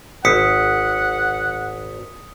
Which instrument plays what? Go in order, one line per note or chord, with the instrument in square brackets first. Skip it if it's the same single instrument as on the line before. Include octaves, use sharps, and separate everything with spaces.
[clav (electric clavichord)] G#1 [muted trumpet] F#5 [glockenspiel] D#6 B6 C#7